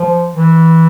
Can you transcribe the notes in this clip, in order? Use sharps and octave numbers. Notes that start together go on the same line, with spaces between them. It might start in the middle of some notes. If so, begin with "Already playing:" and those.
Already playing: F3
E3